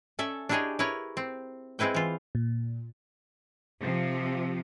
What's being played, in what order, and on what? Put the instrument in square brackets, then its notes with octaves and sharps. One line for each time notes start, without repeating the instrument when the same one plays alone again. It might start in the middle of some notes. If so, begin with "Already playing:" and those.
[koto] C#4 A4 D5 E5
D4 E4 G4 G#4 C#5 D#5
E4 A#4 B4 C#5
C4
G#3 C4 E4 B4 G5
E3 F4
[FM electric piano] A#2
[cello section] C3 F3